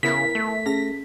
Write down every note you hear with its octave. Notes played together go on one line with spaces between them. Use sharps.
C#3 B3 E4 A#4 B6
A3
C#4 G#4 A#6